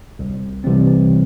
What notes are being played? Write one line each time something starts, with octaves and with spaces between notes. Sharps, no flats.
C2
C3 E3 G3 C4